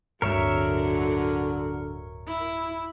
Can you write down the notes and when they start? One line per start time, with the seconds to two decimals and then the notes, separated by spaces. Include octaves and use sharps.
0.22 D1 G2 D3 F#3 A#4 C#5 E5
2.27 E4